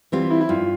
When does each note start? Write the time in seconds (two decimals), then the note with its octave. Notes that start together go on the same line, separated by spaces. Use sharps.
0.12 E3 G3 C4 F4
0.30 E4
0.41 E4
0.49 G2 F4